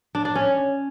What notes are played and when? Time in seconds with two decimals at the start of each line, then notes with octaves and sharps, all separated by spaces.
0.15 D4
0.25 D4
0.35 C#4